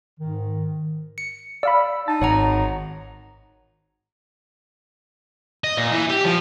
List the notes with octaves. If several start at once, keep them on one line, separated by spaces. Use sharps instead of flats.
G#2 D#3
C#7
D5 F5 B5 E6
D#4 A5
G#1 C#5 F#5 A#5
D#5
A#2
E3
G4
F3